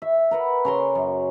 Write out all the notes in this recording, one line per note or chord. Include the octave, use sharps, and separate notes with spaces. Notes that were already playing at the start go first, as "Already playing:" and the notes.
E5
A#4 B4 F#5
C#3 A#5 C6
F#2